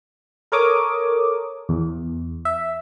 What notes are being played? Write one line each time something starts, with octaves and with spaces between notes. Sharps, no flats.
A4 A#4 C#5 D6 D#6
E2
E5